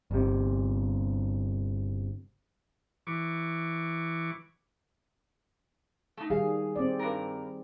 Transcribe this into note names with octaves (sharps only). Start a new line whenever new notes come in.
G1 C3
E3 C#6 D6
A3 D#4
D#3 G3 G#4 F5
C4 D5
G2 A#4